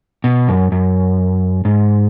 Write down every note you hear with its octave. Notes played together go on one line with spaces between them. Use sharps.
B2
F#2
F#2
G#2